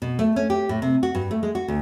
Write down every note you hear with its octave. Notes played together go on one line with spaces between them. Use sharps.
B2
A3
C#4
G4
A2
C3
F#4
G2
A3
G#3
F#4
D2